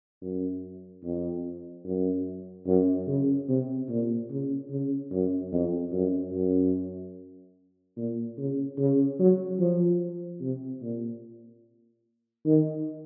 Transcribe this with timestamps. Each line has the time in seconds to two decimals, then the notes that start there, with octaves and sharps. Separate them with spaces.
0.22 F#2
1.04 F2
1.85 F#2
2.67 F#2
3.08 C#3
3.48 C3
3.89 A#2
4.30 C#3
4.70 C#3
5.11 F#2
5.52 F2
5.93 F#2
6.33 F#2
7.97 A#2
8.38 C#3
8.78 C#3
9.19 F#3
9.60 F3
10.41 C3
10.82 A#2
12.45 D#3